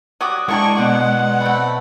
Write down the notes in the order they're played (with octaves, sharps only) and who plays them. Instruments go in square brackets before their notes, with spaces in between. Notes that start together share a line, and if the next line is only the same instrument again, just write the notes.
[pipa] F#3 G3 F#4 [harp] D6 D#6
[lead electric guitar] G#3 [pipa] A#3 D4 G5 [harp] E4 A#4 D5 [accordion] C#6
[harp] B2 D5 [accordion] F#5
[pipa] A3 C4 [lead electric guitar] B5